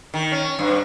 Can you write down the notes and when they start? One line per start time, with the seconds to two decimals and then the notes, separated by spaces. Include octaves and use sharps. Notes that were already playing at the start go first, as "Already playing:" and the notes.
0.14 D#3
0.32 C#4
0.59 G2